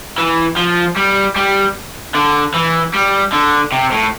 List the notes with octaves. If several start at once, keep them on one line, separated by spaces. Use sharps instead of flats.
E3
F3
G3
G3
D3
E3
G3
D3
C3
A2